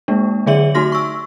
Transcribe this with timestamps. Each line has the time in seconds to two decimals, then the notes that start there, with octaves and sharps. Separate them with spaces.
0.08 G#3 A#3 D4
0.46 D3 F#3 G#4 D5 E5 F#7
0.75 A3 D#4 F#4 C6 A#6
0.92 C#6 E6